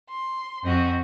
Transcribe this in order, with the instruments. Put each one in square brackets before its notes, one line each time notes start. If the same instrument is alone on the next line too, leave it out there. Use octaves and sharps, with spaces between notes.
[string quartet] C6
F2 C4 F#4 D#5